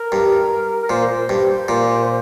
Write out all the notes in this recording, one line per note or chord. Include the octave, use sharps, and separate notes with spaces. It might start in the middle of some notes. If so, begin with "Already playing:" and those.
Already playing: A#4
G2
A#4
A#2 C5
G2
A#2